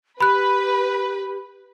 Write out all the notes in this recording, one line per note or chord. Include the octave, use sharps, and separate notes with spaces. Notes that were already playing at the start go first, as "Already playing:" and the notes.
G4 B4 B5 F#6